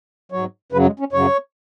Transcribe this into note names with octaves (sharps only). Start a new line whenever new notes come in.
G#2 F#3 C#5
F#2 C#3 F#3 B4
G#3
C#4
F#2 C#3 F#3 C#5